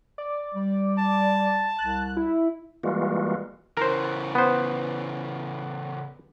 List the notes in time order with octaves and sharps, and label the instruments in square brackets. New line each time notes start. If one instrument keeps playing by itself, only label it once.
[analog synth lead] D5
[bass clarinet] G3
[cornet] A5
[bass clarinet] C2 [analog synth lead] F#6
[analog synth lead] E4
[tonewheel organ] E3 G3 G#3 A#3 F4 F#4
[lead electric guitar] C#3 E3 [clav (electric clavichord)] A#4 C5
[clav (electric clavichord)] B3 C5